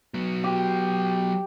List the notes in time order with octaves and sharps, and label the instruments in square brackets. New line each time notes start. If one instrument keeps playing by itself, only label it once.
[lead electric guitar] F#3 B3
[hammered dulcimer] G4